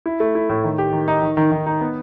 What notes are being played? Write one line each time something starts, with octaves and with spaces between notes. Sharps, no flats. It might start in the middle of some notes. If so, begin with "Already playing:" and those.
E4
A3
E4
A2
D#3
G4
D#3
D#4
D#3
D#3
D#3
D#4
B3